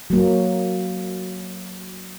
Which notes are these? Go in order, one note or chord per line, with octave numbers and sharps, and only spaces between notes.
F#3 A#3